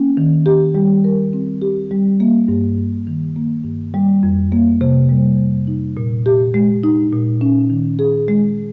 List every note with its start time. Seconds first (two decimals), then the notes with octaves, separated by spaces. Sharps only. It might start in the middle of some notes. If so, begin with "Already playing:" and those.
Already playing: A#3 C#4
0.17 D#3
0.46 G4
0.75 G3
1.04 A#4
1.33 C4
1.62 G4
1.91 G3
2.20 A#3
2.48 G2
2.78 G2
3.07 D#3
3.36 A#3
3.64 G2
3.94 G3
4.23 F2
4.52 A#3
4.81 C3
5.09 G3
5.38 F2
5.67 D#4
5.97 A#2
6.26 G4
6.54 G#3
6.83 D#4
7.12 A#2
7.41 C#4
7.70 D#3
7.99 G#4
8.28 G#3